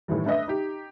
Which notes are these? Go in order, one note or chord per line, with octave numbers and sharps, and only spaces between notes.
A2 D#3 E3 G3
A3 D4 B4 D#5 E5
D#4 G4